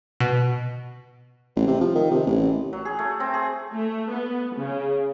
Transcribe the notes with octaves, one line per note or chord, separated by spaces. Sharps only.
B2
A1
C3
F3
D#3
C3
A1
F#3
G#4
A3
C4
G#4
A3
B3
C#3